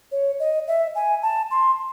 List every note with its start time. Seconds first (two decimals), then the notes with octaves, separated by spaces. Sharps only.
0.12 C#5
0.40 D#5
0.68 E5
0.95 G#5
1.23 A5
1.51 C6